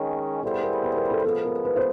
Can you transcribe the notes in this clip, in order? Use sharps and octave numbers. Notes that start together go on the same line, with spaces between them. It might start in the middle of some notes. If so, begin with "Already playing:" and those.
Already playing: D#3 G#3 C#4 C#5
G3 B3 E4 G#4 A4 C5
A#4
B4
A#4
A4
F3 G#3 B3 A4
A#4
B4
C5